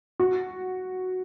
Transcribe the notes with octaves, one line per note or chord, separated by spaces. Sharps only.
F#4